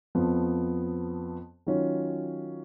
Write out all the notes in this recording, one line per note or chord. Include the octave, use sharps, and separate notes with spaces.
F2 F3 B3
D#3 F#3 C#4 F4